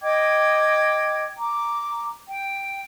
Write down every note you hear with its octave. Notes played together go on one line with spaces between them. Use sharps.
D#5 G5 D6 G#6
A#5 D6
G5